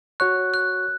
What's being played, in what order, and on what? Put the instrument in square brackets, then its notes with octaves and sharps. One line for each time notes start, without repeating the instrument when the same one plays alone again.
[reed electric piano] F#4 C#5 C#6 [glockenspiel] F#6
[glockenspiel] F#6